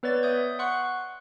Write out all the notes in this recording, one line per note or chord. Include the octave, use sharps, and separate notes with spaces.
B3 B4 C#5 D5 A6
E5 D#6 G6
F#5 C6 C#6 F#6